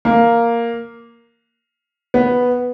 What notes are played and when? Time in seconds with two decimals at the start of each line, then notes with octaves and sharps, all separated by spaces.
0.05 A#3
2.14 B3